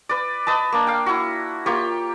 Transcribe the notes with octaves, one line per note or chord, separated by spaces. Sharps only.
B4 D5
B4 D#5 A5
A#3 D4
F5 G5
E4 F#4
A#3 F4 G4 C#5